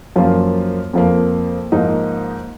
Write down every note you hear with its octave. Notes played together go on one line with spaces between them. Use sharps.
F#2 F3 A#3 F4
F2 F3 A#3
G#2 F3 A#3 D#4